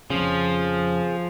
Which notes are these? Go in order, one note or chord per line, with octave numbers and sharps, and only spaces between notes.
F2 C#3 F3 G#4